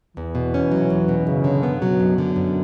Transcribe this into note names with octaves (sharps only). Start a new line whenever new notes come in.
E2 E3
B2
C#4
F#3
E2
B2
F#2 C#3
D3
B3
B2 F#3
F#2
D3
F#2